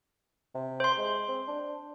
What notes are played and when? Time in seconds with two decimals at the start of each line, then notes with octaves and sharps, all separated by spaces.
0.55 C3
0.80 C5 C6
0.98 G#3
1.29 C4
1.48 D4